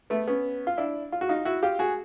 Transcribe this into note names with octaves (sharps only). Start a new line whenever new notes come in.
A3 B3
B3 C#4
F4
D4 E4
F4
F#4
D#4 F4
E4 F#4
F4 G4
F#4 G#4